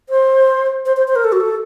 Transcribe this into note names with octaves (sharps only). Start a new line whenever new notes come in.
C5
C5
C5
C5
A#4
A4
F#4
A4